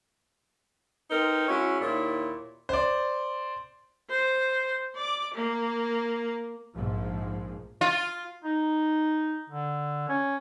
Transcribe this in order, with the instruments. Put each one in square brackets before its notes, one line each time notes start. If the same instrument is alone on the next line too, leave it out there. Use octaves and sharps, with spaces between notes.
[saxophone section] C4 D#4 A#4 B4
G#3 C#4 E4 F#4
D#2 A#2 E4 C#5
[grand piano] C5 D5
[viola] C5
D5 D6
A#3
[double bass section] A#1 G#2 F3
[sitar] F4
[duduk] D#4
D3
C#4